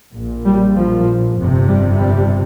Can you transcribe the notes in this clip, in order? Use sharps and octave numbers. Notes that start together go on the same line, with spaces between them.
A#1 A#2
G3
F3
G1 F2 C3
G3
G3